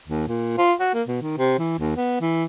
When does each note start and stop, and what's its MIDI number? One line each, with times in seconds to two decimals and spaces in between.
0.08 0.27 39
0.28 0.56 46
0.58 0.73 65
0.80 0.90 66
0.94 1.02 58
1.08 1.19 47
1.22 1.37 51
1.38 1.57 48
1.59 1.74 52
1.79 1.94 39
1.97 2.17 59
2.21 2.45 52